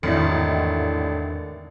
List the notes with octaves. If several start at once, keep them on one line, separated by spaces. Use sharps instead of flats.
A1 E2 G#2 D3 D#3 C4 E4